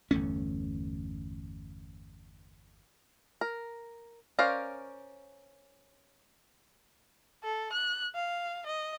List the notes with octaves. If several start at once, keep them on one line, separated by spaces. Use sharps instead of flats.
G1 E2 A3 C#4
A#4
C#4 A#4 C5 D5 F5
A4
F#6
F5
D#5